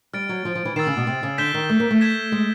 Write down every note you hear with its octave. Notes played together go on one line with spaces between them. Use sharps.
G3 F6 A6 D7
F#3
F3
F3
E3
D#3 E6 A6 C7 E7
C#3
B2
C3
C#3
D3 G6 B6 E7 G7
D#3
A3
A#3
A3
G#6 B6 E7
G#3